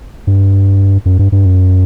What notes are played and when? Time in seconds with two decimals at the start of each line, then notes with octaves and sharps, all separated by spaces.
0.27 G2
1.06 F#2
1.19 G2
1.32 G2
1.45 F#2